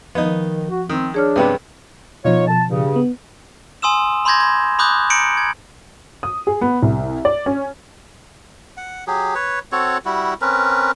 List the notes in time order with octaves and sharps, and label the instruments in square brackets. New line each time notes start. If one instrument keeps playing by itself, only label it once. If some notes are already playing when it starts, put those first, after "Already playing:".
[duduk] D#3 [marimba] F3 [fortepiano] B3 D#4
[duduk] F#4
[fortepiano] D#3 [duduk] C4
[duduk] D4 [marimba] G#4 C#5 F6
[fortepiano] G2 C3 B3 [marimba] B4 G5
[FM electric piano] B2 F3 [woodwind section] D#4 F4 C#5
[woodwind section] A5
G2 C#3
[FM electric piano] B3
[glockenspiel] G#5 C6 D#6 E6 E7
B5 C6 D6 G6 G#6 A#6
B5 G#6
B5 C6 D6 D#6 F#6 G6
A#5 G6 A#6 C#7 D7 F#7
G#6
[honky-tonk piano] D#6
G#4
B3
C2
D5
C#4
[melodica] F#5
F#3 G4 G#4
B4 C#5
C4 F#4 A4 C#5
G3 E4 F#4
C4 C#4 A#4 B4